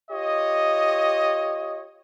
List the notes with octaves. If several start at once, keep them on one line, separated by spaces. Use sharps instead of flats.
F4 G4 C#5 D#5